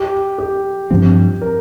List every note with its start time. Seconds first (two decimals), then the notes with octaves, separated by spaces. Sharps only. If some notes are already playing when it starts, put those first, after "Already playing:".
Already playing: G4
0.39 G4
0.91 G2 F3 C4
1.42 A#4